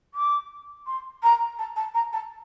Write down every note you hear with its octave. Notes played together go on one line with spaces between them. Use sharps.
D6
C6
A#5
A5
A5
A#5
A5